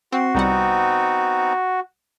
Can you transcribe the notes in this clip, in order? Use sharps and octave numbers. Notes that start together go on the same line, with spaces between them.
C4 F#4 C6
C2 G3 B3 C4 D#4 F#5